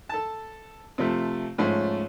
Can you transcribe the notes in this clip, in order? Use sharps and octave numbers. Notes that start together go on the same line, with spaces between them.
A4 A5
C3 F3 A3
G#2 F3 A3 C#4